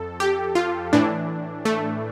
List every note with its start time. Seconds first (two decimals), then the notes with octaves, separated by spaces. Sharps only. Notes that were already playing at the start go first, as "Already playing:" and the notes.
Already playing: F2 A4
0.20 G4
0.55 F4
0.93 A2 E3 D4
1.65 A3